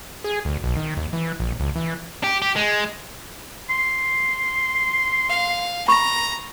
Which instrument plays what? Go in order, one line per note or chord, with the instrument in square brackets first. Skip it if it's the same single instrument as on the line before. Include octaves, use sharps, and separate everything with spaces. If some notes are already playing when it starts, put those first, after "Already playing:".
[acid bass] G#4
D2
B1
D#3
D#2
E3
A#1
C#2
E3
[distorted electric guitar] G4
G4
G#3
[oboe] C6
[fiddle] F5
[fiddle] A#5 [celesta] B5 C#6